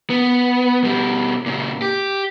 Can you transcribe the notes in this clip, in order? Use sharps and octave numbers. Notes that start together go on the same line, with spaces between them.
B3
B2 G3
A#2 C#3
G4